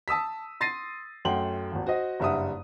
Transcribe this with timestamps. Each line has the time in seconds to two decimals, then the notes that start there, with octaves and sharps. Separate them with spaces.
0.08 A5 D#6 E6 B6
0.61 C6 A6 A#6 C7 D#7
1.25 F#2 A3 F#5 G5 C6 F#7
1.72 G#1 D#2
1.87 F#4 C5 D#5
2.20 F#1 G2 E5 F#5 D#6